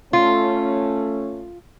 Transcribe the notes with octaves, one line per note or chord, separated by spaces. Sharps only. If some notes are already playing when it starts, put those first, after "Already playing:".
A3 C#4 F4